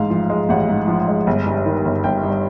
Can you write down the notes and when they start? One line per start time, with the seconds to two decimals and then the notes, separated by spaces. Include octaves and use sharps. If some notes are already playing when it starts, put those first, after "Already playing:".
Already playing: A1 G#2 F5
0.10 F3
0.30 G#3
0.49 A1 F#5
0.69 G#2
0.88 F3
1.08 G#3
1.27 G1
1.46 G2
1.65 D#3
1.85 G1
2.04 G1 G5
2.23 G2